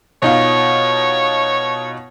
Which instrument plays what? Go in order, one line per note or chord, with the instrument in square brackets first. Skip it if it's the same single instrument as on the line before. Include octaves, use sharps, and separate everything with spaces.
[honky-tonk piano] B2 D#4 F4 [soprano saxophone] C#5